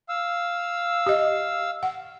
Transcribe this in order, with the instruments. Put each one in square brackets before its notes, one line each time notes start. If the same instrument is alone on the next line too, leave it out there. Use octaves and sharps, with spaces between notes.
[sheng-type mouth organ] F5 E6
[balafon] G4 D#5
F#5